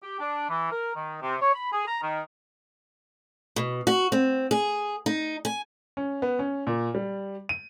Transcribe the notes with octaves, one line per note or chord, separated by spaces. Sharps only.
G4
D4
E3
A#4
D#3
C3
C#5
B5
G#4
A#5
D#3
B2
F#4
C4
G#4
D#4
G#5
C#4
B3
C#4
A#2
G3
D#7